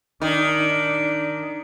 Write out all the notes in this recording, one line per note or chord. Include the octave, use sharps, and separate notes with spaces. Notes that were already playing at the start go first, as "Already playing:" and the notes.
D#3 D4